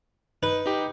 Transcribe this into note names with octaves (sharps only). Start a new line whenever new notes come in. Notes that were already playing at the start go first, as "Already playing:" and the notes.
D#4 B4
D#4 G4